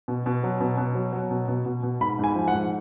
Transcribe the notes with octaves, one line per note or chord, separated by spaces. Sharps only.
B2
B2
F#3
B2
B2
F#3
F#3
B2
B2
B2
B2
G#2 B5
G#2 G#5
F3
F#5
G#2